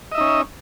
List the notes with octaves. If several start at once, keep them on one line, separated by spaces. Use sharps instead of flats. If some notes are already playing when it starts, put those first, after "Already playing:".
C#4 D#4 D#5 E5